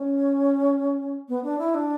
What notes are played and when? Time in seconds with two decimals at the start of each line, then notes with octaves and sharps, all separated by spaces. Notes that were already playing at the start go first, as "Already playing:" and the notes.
Already playing: C#4
1.29 B3
1.43 D4
1.59 E4
1.74 D4